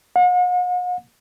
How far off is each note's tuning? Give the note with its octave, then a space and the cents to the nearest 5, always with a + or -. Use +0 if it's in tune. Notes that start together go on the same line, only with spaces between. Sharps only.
F#5 -45